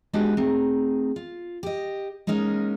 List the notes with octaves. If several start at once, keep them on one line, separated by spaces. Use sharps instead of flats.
G#3 B3 D4 D#4 F#4 G4
A3 C4 D#4 G#4
F4
G4 D#5
G#3 A#3 C#4 D#4 A#4